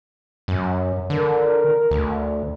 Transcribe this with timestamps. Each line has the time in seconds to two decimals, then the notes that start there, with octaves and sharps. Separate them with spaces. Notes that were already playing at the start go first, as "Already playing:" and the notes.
0.48 F#2
1.10 D3 A#4
1.91 D2